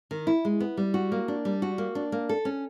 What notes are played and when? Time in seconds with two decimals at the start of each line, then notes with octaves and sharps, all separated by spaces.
0.11 D#3
0.27 E4
0.45 G#3
0.60 B3
0.77 G3
0.94 F#4
1.12 A#3
1.28 D4
1.45 G3
1.62 F#4
1.78 A#3
1.95 D4
2.12 A#3
2.29 A4
2.45 C#4